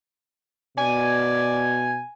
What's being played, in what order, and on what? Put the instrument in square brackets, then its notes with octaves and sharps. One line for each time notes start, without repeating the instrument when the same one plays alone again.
[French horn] B2 [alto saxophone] D5 [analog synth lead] G#5